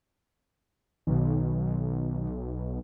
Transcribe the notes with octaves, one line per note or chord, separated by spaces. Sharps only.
B1 B2 D#3